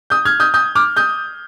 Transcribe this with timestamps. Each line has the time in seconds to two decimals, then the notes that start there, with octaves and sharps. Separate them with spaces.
0.10 D#6 G6
0.25 F6 G#6
0.40 D#6 G6
0.54 D#6 G6
0.75 D6 F6
0.96 D#6 G6